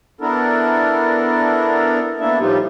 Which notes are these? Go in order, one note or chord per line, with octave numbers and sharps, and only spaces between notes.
B3 D4 E4 A4 A#4
A#3 B3 D4 E4 A4 E5
A2 F3 G3 D#4 F4 G4